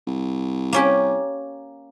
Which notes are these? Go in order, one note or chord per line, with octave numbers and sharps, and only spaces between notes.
C2
A#3 C#4 G4